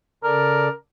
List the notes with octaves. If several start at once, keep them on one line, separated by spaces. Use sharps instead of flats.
C#3 A4 A#4 D5